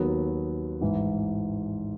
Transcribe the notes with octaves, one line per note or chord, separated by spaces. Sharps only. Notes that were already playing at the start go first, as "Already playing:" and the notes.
Already playing: D#2 D#3 F#3 B3 F#4
A1 G#2 E3